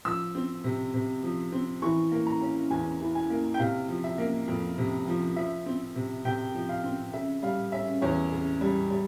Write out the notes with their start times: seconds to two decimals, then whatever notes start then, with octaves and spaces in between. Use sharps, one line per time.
0.05 F3 E6
0.35 C4
0.64 C3
0.94 C3
1.23 F3
1.52 C4
1.82 E3 C#6
2.12 A#3
2.27 A#5
2.41 C#4
2.70 E2 G#5
3.00 E3
3.15 G#5
3.30 A#3
3.54 G5
3.59 C3 F5
3.89 F3
4.04 E5
4.18 A#3
4.48 F2
4.78 C3
5.08 F3
5.36 F3 E5
5.66 C4
5.95 C3
6.25 C3 G5
6.55 F3
6.69 F5
6.84 C4
7.13 C#3 E5
7.43 G3 F5
7.72 C#4 E5
8.02 E2 C#5
8.32 C#3
8.61 G3
8.90 G3